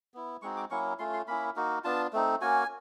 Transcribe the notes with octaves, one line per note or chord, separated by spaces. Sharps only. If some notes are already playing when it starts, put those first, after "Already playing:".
B3 E4
G#3 C4 D#4 F#4 C#6
D6
F#3 A#3 C#4 E4 C#6
A3 C#4 F4 C6
C6
A#3 C#4 E4 B5
A#3 D#4 F#4
B3 D4 F4 A5
A3 C4 D#4
A#3 C#4 F#4 G#5